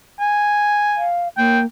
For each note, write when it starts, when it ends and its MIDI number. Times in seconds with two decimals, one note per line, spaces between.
0.20 1.06 80
0.97 1.28 77
1.38 1.66 58
1.38 1.60 79